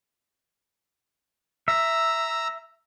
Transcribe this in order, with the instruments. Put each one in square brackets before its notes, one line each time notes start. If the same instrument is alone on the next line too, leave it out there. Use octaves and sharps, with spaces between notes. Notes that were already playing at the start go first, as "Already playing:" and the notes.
[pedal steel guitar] E5 [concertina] A#5 E6